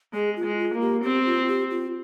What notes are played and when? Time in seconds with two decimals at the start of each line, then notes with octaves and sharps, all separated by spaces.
0.13 G#3 G#4
0.36 F4
0.44 G#3
0.59 F4
0.74 A#3
0.81 G4
1.03 C4 G4
1.26 F4
1.48 G4
1.71 F4